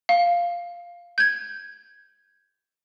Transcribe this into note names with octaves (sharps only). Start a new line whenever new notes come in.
F5
G6 G#6